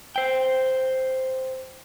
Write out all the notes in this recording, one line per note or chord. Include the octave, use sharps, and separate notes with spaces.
C5 G5